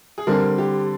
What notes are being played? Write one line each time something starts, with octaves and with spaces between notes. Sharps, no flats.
G#4
D3 G3 C4 A#4
G4